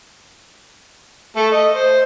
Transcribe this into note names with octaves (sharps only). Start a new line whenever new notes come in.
A3 A4
D#5
C5